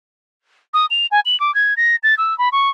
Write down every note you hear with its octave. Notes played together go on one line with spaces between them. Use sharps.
D#6
F7
G#5
F#7
D6
G#6
A#6
A6
E6
B5
C#6